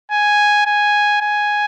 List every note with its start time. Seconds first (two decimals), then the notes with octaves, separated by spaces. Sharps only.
0.11 G#5
0.66 G#5
1.21 G#5